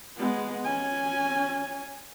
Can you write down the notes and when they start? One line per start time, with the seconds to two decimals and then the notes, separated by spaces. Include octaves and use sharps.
0.17 G#3 B3
0.64 C#4 G#5